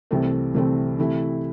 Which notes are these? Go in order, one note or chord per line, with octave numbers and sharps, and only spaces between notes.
C2 C3 E3 A3 C4
C2 C3 E3 A3 C4
C3 E3 A3 E4